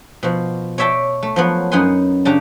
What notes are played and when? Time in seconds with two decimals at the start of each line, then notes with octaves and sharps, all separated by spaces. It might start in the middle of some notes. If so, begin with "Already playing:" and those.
0.23 B2 F3
0.78 C#5 D5 E5 G5 A5
1.23 A3
1.36 F3 F#3 B3
1.71 F#2 B3 D#4 F#5 G#5 C6
2.25 C#3 D4 G4 A#5